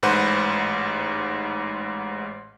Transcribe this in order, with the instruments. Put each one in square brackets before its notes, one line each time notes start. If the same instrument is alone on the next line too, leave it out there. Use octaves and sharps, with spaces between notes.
[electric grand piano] A1 G#2 B4 C5 F#5